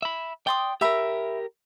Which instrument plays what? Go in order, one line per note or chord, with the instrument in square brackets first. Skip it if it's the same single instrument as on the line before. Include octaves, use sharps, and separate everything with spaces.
[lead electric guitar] E5 B5
[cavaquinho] D5 C6 D#6 [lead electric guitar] G5
[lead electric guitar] G4 A#4 [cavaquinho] E5 B5